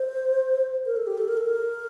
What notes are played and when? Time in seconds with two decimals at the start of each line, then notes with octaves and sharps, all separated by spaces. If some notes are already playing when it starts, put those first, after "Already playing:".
Already playing: C5
0.86 A#4
0.96 A4
1.07 G4
1.18 A4
1.28 A#4
1.37 A4
1.46 A#4